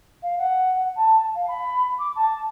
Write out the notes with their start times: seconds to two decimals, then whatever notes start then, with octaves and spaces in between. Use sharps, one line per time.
0.23 F5
0.38 F#5
0.96 A5
1.35 F5
1.48 B5
1.99 D6
2.16 A5